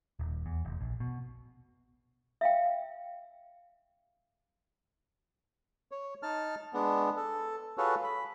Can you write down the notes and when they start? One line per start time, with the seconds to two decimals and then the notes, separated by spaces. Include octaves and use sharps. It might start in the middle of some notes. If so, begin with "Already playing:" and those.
0.19 D#1
0.46 E2
0.65 F1
0.80 A#1
1.00 B2
2.41 E5 F5 G5
5.91 C#5
6.23 D#4 A5 F6
6.74 G#3 B3 D4
7.17 A4
7.78 F4 F#4 G#4 A4 B4 C#5
8.04 B5